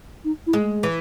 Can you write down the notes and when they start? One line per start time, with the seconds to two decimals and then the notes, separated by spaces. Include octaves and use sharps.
0.25 D#4
0.47 E4
0.53 G#3
0.83 E3